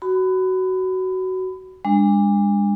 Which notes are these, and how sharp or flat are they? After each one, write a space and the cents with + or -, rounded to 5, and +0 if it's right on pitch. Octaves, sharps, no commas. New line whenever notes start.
F#4 +15 B5 +25
G#3 -35 D4 +0